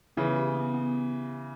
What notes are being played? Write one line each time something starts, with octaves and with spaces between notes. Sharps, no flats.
C#3 E3 B3
G4
B3
B3